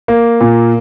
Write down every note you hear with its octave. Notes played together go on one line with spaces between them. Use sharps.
A#3
A#2